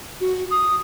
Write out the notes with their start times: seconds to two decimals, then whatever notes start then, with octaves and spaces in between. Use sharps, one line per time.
0.21 F#4
0.51 D#6